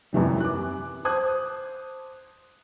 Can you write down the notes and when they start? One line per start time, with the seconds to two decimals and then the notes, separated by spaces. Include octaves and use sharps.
0.13 F#2 C3 E3 G3
0.40 D6 F#6
1.05 C5 A5 D6 D#6 F#6 G#6